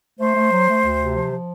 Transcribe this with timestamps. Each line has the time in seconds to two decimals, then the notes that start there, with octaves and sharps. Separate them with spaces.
0.19 A3 C5
0.35 A3
0.51 F#3
0.67 A3
0.84 D2
1.00 C3
1.16 F3
1.31 F3